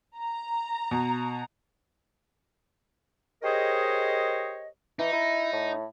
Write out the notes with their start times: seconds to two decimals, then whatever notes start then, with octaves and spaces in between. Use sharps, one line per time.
0.18 A#5
0.91 B2
3.43 G4 G#4 A#4 C5 C#5 D#5
4.99 E3 D#4
5.12 E4
5.52 A2